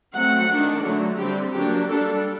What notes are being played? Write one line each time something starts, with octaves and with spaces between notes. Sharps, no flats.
F#3 A3 C4 F#5
D#3 A3 D4
D3 F#3 A3
D3 G3 C4 G4
F#3 A#3 D4 G4
G3 D4 A4